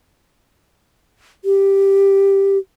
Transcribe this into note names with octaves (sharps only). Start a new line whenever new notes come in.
G4